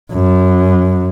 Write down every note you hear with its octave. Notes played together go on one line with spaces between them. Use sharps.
F#2